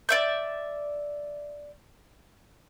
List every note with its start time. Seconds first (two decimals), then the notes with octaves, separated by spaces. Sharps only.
0.09 D5 E5 G6